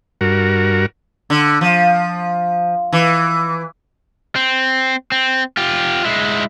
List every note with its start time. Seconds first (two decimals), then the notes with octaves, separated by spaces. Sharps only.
0.21 G2 F#4 A#4
1.30 D3
1.61 F3
2.93 E3
4.36 C4
5.12 C4
5.57 F4 G4
6.05 G#3 E4